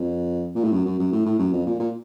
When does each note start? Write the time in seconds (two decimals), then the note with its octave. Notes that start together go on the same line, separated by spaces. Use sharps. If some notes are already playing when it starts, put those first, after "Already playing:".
Already playing: F2
0.55 A#2
0.63 A2
0.72 F#2
0.86 F#2
0.99 F#2
1.12 A2
1.26 A2
1.39 F#2
1.53 F2
1.66 A#2
1.80 A#2